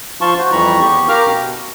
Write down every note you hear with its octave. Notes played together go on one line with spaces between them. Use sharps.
F3 F5 A5 C6 C#6
F#4 C5
F2 E3 G3 A#5 B5 C#6
E2 G4 C#6
G4 A#4 F5 A#5 D6 F6
B2